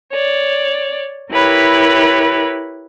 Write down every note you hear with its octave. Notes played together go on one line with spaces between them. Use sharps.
C#5 D5
E4 G4 A#4 B4 C#5 B5